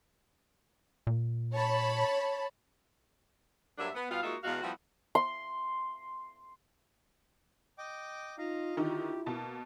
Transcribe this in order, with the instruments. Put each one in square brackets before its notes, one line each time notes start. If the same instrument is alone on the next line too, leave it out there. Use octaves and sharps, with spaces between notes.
[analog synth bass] A#2
[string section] C#5 A5 B5
[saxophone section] G2 F#3 A#3 D4 E5
B3
B2 G3 B3 F4 F5
G#3 A#3 D#4 F4 F#4 E5
E2 B2 G#3 F#4 F5
F3 G3 A3 B3 E4 F#4
[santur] C6
[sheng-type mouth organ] D#5 G5 D6
[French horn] D#4 [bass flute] F4 [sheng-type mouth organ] D#5 F5 A#5
[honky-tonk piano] D3 D#3 D#4 [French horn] E4 [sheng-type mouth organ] G4
[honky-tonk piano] B2 A5 [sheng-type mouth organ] A#3